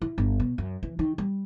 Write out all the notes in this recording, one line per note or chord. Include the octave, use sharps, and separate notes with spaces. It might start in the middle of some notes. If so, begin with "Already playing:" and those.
E4
G1
B2
F#2
E3
D#3
G3